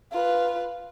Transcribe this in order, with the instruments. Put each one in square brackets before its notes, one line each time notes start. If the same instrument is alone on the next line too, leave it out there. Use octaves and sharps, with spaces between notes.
[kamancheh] F4 B4